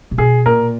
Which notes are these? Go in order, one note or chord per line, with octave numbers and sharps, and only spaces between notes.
C3
B2 G#4
A#2 A#4